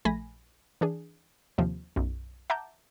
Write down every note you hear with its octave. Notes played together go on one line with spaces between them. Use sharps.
A#1 A3 G#5 B5 A#6
E3 D4 G#4
D#2 C3 F3
B1 F#2
E5 F#5 A5 A#5 D6 G6